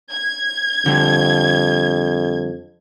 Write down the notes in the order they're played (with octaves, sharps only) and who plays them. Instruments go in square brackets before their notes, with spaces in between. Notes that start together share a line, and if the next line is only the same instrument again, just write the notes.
[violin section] G#6
[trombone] F2 [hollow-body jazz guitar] D3 G3